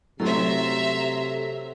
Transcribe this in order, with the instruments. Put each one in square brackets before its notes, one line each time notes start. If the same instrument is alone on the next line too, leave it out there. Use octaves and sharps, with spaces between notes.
[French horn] C3 [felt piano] F#3 A3 C4 [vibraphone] A4 [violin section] E5 A#5 C6